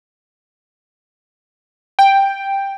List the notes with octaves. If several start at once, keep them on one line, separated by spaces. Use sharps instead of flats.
G5